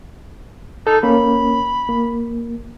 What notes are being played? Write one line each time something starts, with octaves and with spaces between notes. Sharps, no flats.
D#4 A4
A#3 C#4 B5
A#3